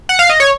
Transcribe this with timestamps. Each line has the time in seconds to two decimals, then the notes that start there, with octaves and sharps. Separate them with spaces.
0.09 F#5
0.19 F5
0.29 D#5
0.40 C#5